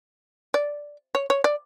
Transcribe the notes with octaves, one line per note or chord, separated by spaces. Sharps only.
D5
C#5
C#5
D5